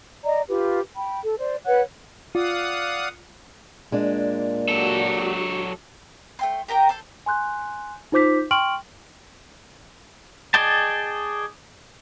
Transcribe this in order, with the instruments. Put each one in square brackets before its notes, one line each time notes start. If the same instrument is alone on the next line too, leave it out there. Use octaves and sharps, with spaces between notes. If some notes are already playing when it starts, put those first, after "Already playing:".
[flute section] D5 D#5 A#5
F4 G4 B4
G5 B5
A4
C5 D5
B4 C#5 F#5 F#6
[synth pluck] F4 [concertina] D5 [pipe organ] F5 F#5 D#6
[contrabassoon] A#2 [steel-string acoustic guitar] G#3 D4
[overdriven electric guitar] F#3 A4 [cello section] F#4 G4 D5
[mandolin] A3 G5 C6
G4 A#4 G5 A#5
A4 C5
[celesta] G#5 C6 F#6 G6
D#4 F4 C5 D6 G6 B6
G5 C6 C#6 F6 D7 F#7
[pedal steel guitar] G#4 D5 D#5 G5 A5